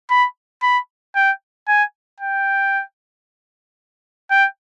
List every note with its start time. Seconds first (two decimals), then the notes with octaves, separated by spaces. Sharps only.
0.10 B5
0.63 B5
1.16 G5
1.68 G#5
2.20 G5
4.31 G5